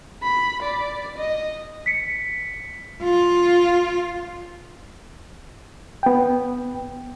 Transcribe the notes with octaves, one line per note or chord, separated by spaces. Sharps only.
B5
D5
D#5
B6 C#7
F4
B3 G5